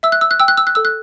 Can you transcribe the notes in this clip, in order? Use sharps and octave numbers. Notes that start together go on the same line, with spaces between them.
E5 E6
F#6
E6
F#6
G5 E6
F#6
E6
F#6
A4 E6
F#6